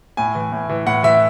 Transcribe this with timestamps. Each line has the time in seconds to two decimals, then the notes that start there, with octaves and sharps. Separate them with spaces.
0.17 A2 G#5
0.35 E3
0.52 A2
0.69 E3
0.86 A2 F#5
1.03 E3 E5